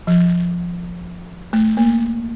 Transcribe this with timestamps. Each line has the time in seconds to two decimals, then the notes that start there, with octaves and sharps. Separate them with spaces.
0.07 F3
1.53 A3
1.77 A#3